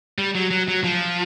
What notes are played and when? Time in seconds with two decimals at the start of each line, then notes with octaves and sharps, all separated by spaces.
0.18 G3
0.35 F#3
0.51 F#3
0.68 F#3
0.84 F3